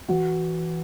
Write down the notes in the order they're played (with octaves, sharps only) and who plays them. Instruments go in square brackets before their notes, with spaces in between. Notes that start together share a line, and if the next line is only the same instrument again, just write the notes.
[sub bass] E3 [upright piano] F#4